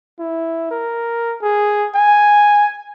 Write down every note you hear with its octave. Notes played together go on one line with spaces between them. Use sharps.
E4
A#4
G#4
G#5